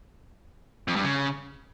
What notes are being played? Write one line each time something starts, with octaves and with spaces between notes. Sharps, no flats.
F2
G2
C#3